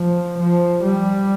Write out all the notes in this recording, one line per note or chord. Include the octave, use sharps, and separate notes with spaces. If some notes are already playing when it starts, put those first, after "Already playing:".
Already playing: F3
F3
G3